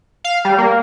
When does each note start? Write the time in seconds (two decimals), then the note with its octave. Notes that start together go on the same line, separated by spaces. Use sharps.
0.24 F5
0.45 G3
0.58 A#3